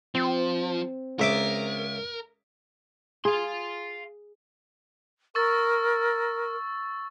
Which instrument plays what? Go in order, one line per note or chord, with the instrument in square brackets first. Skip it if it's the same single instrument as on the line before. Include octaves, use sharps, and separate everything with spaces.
[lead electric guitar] F3 [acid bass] C4
[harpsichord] C#2 E5 D6 [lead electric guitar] A#4
[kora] G#4 [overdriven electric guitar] F5 C6
[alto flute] A#4 [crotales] C#6 E6 A6